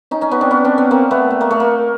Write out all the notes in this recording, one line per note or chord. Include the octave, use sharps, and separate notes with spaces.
C#4 D#4
C#4 D#4
B3 C#4
C4 D4
B3 C#4
C4 D4
B3 C#4
A#3 C4
A3 B3
A3
A#3
A3
A#3